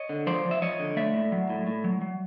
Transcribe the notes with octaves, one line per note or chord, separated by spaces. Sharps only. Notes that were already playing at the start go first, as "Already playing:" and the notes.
Already playing: C#5 D#5
D3
F3 C5 D5
F3
E5
F3 C#5 D#5
D3
A3 D5 E5
A2
F#3
A2
A2
F#3
F#3